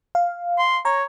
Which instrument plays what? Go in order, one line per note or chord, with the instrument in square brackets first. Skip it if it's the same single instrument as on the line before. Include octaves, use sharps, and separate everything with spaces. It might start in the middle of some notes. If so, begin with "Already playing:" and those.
[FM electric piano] F5
[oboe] C6
[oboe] C#5 [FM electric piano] A#5